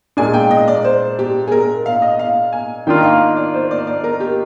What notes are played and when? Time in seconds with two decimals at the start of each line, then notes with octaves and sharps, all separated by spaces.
0.17 A#2 G#3 D4 G#5
0.34 G5
0.51 D#5
0.68 D5
0.84 C5
1.19 G4
1.47 G#4
1.52 A#4
1.86 F5
2.02 D#5
2.19 F5
2.53 G#5
2.87 D#3 A#3 D4 F4 G5
2.98 D#5
3.03 F5
3.20 D#5
3.36 D5
3.54 C5
3.71 D5
3.87 D5
4.04 A#4
4.20 G4